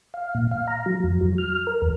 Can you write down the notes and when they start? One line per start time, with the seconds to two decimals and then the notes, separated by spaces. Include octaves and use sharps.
0.14 F5
0.35 A#2
0.51 F5
0.68 A#5
0.86 F#3
1.04 F2
1.21 F#3
1.38 F6
1.67 A#4
1.82 E2